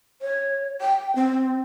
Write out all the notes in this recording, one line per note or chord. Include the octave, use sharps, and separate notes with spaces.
C#5
G5
C4